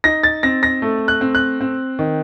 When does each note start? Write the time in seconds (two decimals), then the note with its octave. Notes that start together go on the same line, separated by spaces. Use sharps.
0.04 D#4 A#6
0.23 A6
0.43 C4 A#6
0.63 A#6
0.82 A3
1.08 F#6
1.21 C4
1.35 F#6
1.61 C4
1.99 D#3